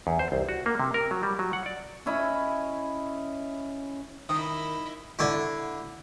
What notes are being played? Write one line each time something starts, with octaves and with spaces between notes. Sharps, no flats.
E2
C5
C2
F#4
A#3
C3
A#4
F#3
G3
F#3
F#5
D5
C#4 E4 D#5 B5
D#3 E4 D#5 D#6
D3 E4